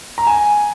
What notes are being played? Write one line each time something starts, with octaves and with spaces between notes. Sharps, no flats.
A#5
G#5